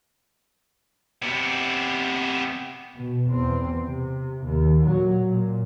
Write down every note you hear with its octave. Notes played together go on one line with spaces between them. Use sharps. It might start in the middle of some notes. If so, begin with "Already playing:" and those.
C3 B3
B2
E2 C4
C3
D#2
A#2 F#3
A#2